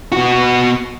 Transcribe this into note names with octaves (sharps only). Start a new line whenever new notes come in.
B2 F#4